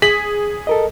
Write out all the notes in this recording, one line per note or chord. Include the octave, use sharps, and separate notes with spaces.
G#4 B6 F#7
A4 A#4 D#5